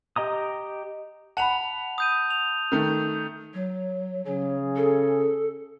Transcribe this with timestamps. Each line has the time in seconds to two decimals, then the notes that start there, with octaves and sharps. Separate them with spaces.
0.16 G4 D#5 A#5 D#6
1.37 F#5 A5 B5 F7
1.98 D#6 G6 D#7
2.30 F7
2.72 D#3 A3
3.54 F#3
4.25 C#3 F#3 G#4
4.76 A4